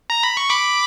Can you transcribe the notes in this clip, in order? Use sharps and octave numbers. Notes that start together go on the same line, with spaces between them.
A#5
B5
C#6
B5 D6